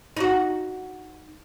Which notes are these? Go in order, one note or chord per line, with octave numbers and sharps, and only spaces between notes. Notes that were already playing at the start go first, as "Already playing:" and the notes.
D#4 F#4